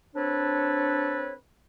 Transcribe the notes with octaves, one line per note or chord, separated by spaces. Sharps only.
C4 D4 A4 B4 C#5